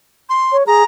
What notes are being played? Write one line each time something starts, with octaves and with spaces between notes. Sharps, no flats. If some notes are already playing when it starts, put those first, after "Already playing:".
C6
C#5
G#4 A#5